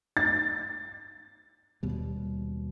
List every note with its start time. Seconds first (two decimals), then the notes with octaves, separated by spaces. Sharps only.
0.17 A6
1.83 D#2 B2 G3